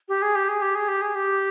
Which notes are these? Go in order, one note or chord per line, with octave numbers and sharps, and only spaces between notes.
G4
G#4
G4
G#4
G4
G#4
G4
G#4
G4